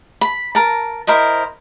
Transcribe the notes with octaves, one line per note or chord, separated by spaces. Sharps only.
B5
A#4 A5
E4 A#4 C5 D#5